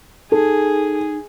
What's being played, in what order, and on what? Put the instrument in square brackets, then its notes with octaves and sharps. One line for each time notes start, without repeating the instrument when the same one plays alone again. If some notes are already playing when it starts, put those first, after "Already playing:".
[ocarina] D#4 [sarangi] G#4 [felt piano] A4